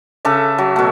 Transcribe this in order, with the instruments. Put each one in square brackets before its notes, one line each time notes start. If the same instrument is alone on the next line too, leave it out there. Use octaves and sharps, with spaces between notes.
[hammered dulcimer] C#3 A4 E5 D6
F#3
B2 A3